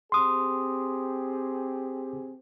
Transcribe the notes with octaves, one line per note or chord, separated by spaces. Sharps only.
C4 G4 G#4 C6 D#6